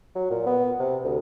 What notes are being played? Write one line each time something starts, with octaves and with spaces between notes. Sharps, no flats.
F#3
A#2
B3
C3
D2